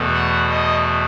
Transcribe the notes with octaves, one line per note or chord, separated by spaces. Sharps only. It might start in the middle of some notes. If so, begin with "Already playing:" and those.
Already playing: E2 B2 A3
F#5
D#5